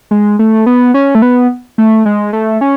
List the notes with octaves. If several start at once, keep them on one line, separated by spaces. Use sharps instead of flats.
G#3
A3
B3
C#4
A3
B3
A3
G#3
A3
C#4